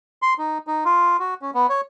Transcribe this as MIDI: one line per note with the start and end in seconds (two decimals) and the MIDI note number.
0.22 0.34 84
0.38 0.58 63
0.67 0.84 63
0.85 1.17 65
1.20 1.34 66
1.42 1.51 61
1.54 1.67 59
1.69 1.81 73